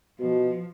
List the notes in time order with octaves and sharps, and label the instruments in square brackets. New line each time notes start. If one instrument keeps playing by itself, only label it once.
[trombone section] B2 [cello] F3